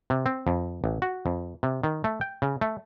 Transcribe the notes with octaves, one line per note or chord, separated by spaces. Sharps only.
C3
C4
F2
A1
F#4
F2
C3
D#3
A3
G5
C#3
A3